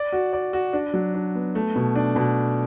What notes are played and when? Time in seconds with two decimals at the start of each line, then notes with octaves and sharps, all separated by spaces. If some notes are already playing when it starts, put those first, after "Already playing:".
Already playing: D5
0.12 F#4
0.33 D5
0.53 F#4
0.73 D4
0.94 F#3
1.15 D4
1.35 B3
1.55 A3
1.76 B2
1.95 D4
2.16 B2